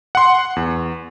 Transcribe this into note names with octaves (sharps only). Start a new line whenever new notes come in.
F#5 C6
E2